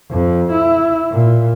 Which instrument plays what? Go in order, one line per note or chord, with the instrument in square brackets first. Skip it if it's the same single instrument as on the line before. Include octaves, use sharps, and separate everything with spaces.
[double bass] F2
E4
A#2